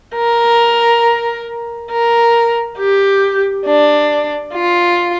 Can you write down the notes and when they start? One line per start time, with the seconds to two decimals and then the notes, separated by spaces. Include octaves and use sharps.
0.15 A#4
1.91 A#4
2.78 G4
3.66 D4
4.54 F4